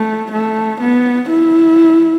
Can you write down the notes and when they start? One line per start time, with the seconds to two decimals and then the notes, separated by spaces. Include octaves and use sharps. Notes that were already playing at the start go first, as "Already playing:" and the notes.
Already playing: A3
0.32 A3
0.81 B3
1.30 E4